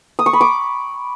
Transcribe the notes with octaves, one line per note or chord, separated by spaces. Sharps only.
D#6
C#6
B5
D6